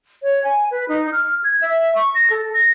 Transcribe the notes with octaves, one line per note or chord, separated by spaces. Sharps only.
C#5
G#5
B4
D#4
F6
G#6
E5
C#6
A#6
A4
A#6